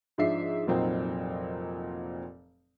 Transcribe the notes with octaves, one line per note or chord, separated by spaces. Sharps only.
G#2 F3 D4 E5 C7
F1 A#2 F#3 C4 D#4